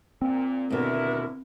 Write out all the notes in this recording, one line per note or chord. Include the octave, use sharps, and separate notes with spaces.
A#2 C4
D#2 B2 D3 E4 A#4